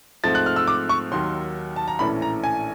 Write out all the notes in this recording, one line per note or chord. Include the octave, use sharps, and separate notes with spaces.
G#2 F3 A3 C4 A6
F#6
F6
E6
D6
C#6
D#2 D#3 F#3 C6
A5
A#5
A#1 A2 E3 A3 C#4 B5
A#5
G#5